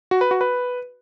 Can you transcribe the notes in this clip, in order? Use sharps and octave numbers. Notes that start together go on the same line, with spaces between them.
F#4
B4
F#4
B4